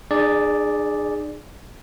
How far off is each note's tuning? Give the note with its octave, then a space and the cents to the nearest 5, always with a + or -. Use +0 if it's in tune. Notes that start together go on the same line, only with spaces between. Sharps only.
D4 +45 G#4 +0 D5 +0